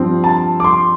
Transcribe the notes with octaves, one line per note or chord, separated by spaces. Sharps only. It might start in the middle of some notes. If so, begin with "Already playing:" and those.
Already playing: G2 F3 C4
A5
D6
C6